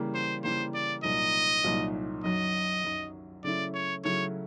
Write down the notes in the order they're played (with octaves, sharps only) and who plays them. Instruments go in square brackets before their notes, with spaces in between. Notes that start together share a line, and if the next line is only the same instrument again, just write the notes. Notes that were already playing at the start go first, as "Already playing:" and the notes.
Already playing: [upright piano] C#3 E3 G3 A#3
[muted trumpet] C5
[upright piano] C#3 E3 G3 A#3 [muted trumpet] C5
[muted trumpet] D5
[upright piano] C2 A#2 F#3 A#3 D#4 [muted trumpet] D#5
[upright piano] C2 A#2 F#3 A#3 D#4
[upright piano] F#2 D#3 F#3 [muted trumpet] D#5
[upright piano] F#2 D#3 F#3
[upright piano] C#3 F#3 A3 C#4 E4 [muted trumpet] D5
[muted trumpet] C#5
[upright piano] C#3 F#3 A3 C#4 E4 [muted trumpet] C#5